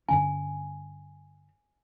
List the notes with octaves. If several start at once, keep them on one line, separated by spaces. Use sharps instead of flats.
G2 D3 C#4 G#5